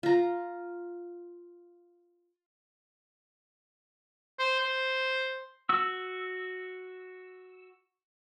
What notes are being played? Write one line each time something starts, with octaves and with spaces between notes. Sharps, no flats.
F4 A#5
C5
C5
F#4 E6